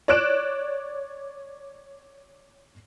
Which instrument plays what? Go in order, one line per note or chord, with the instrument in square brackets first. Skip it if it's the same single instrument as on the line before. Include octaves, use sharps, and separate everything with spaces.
[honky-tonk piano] C#5 D5 F#6 D7 E7